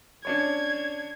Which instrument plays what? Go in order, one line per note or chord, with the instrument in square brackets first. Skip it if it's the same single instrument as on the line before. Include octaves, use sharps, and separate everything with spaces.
[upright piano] C#4 D4 C#5 [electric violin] G#6